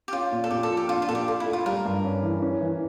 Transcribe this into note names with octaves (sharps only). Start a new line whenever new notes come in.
G4
C#4 F4
A#2
A4
A#2 G4
A4
F3
G4
D4 F4
F4
A#2 A4
G4
F4 A4
E4
A3
F4
G3 A#4
G2
C#4
E3
C#4
E3